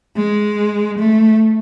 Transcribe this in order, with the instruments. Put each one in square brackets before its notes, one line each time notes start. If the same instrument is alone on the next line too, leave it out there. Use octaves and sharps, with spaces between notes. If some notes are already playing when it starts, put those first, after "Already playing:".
[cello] G#3
A3